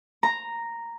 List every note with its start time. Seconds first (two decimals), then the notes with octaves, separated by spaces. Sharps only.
0.23 A#5